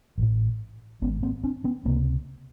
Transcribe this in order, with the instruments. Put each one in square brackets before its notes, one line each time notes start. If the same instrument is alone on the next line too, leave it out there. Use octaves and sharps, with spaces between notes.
[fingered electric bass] A1 A2
G#1 G#2 B3 C#4
A#3 C4
C4 D4
B3 C#4
C#2 C3 A#3 C4